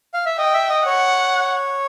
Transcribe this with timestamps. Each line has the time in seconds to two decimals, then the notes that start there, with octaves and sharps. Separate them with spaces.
0.14 F5
0.26 E5
0.38 D#5 G5
0.54 E5
0.69 D#5
0.85 C#5 F#5